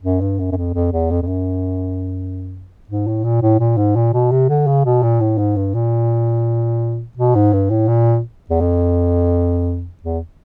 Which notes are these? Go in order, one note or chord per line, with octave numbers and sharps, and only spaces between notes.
F#2
G2
F#2
F#2
F2
F2
E2
F2
F2
F#2
G#2
A2
A#2
A2
A#2
G#2
A#2
B2
C3
D3
C#3
B2
A#2
A2
G#2
G2
A#2
B2
G#2
G2
A2
A#2
E2
F2
E2